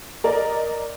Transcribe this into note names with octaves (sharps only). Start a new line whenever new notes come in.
A#4 D5 D#5